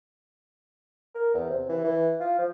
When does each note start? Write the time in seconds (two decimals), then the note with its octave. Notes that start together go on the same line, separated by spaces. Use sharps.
1.15 A#4
1.34 E2
1.50 C3
1.69 E3
1.84 E3
2.20 F4
2.38 F3